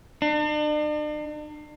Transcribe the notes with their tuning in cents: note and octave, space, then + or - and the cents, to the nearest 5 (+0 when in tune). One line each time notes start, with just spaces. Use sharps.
D4 +45